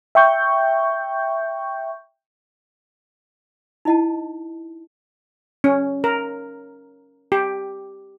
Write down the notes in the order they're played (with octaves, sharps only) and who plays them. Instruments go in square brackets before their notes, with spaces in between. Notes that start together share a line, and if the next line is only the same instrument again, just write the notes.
[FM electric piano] E5 G5 C#6 G6
[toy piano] D#4 E4 D#5 F#5 A5
[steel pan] C#4
A#4
G4